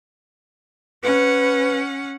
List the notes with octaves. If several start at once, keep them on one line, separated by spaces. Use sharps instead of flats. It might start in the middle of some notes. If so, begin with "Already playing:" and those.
C#4 B4 F#5